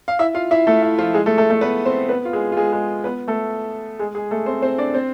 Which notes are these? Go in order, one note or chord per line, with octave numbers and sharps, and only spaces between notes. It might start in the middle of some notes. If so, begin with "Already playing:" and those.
F5
E4 E5
F4 F5
E4 E5
A3 A4
E4
F3 F4
G#3 G#4
A3 A4
A3 A4
A3 A4
B3 B4
C4 C5
B3 B4
F4
G#3 G#4
F4
G#3 G#4
G#3 G#4
B3 B4
A3 A4
G#3 G#4
G#3 G#4
A3 A4
C4 C5
C4 C5
D4 D5
C4 C5